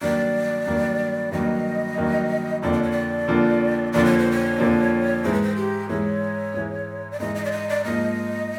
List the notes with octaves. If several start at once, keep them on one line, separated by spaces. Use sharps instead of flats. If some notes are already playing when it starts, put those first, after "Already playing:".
G2 D#3 F#3 A#3 D4 D5
G2 D#3 F#3 A#3 D4
G2 D#3 F#3 A#3 D4 D#5
G2 D#3 F#3 A#3 D4
F2 D3 F3 A#3 D4 D#5
D5
C#5
D5
F2 D3 F3 A#3 D4
F2 D3 F3 A#3 D4 D5
C#5
C5
C#5
F2 D3 F3 A#3 D4
G#2 E3 G#3 C5
B4
C5
G4
G#2 E3 G#3 C#5
G#2 E3 G#3
D5
G#2 E3 G#3 D#5
D#5
D5
D#5
D5
G#2 F3 A#3 D#5